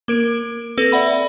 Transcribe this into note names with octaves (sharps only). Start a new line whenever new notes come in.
A#3 A#4 D7
C4 A4 B4
D5 E5 F#5 B5